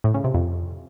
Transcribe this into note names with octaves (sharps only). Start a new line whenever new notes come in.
A2
C#3
C3
F2